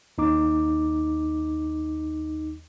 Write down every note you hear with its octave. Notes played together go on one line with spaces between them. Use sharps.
D#2 D#4 D6